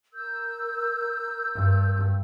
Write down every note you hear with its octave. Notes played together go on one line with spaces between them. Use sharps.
A#4 E6 G6
G2